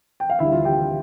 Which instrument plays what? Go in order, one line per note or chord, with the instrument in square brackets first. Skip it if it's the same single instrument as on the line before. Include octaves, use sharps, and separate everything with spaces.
[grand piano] G5
F5
D2 D3 G3 E4 E5
F4 F5
G4 G5